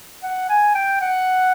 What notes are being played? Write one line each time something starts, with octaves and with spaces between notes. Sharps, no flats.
F#5
G#5
G5
F#5